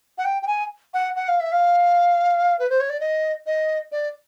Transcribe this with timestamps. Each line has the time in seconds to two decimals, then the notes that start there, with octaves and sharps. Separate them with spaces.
0.18 F#5
0.24 G5
0.42 G5
0.47 G#5
0.93 F#5
1.16 F#5
1.28 F5
1.40 E5
1.52 F5
2.59 B4
2.69 C5
2.80 C#5
2.89 D5
3.00 D#5
3.46 D#5
3.92 D5